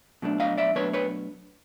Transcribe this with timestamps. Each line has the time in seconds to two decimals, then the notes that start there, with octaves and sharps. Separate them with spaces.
0.22 B2 F#3 A3 D4
0.40 D#5 F5
0.58 D5 E5
0.75 B2 F#3 A3 D4 B4 C#5
0.93 B4 C#5